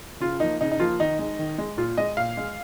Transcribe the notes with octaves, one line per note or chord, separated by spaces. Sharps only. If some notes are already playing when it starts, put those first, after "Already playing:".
C#3 F4
F3 A#3 D#4
C#3 D#4
D#4
F3 A#3 F4
D#3 D#4
G#3
D#3
G#3
A#2 F4
G#3 D#5
A#2 F5
G#3